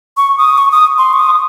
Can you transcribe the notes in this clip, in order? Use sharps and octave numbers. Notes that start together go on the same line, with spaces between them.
C#6
D#6
C#6
D#6
C6
C#6
D#6